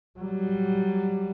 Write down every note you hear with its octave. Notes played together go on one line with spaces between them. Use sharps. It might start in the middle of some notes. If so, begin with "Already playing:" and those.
F#3 G3